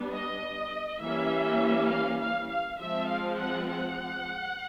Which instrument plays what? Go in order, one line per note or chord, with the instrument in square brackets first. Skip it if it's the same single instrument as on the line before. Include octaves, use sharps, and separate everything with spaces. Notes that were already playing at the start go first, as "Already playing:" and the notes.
Already playing: [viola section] G3 B3 D4
D#5
E3 G3 A#3 C#4 E5
F5
F5
F5
F3 G#3 C4 E5
F5
F#5
F#5